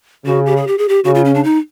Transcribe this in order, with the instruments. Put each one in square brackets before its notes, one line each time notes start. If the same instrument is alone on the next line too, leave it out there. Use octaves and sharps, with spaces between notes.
[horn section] C#3 [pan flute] F#4
[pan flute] G4
G#4
G4
G#4
G4
[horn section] C#3 [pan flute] F#4
[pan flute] F4
C#4
D4
D#4